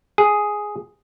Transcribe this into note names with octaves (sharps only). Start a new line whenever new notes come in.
G#4